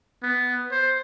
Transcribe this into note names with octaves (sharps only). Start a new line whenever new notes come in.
B3
C5